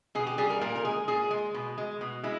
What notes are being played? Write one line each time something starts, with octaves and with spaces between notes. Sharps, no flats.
B2 G#4
G4
G3 G#4
A#4
A#2 A#4
A#4
G#3 G#4
A#2 G#4
G#3
B2
G#3
B2
G#3 E4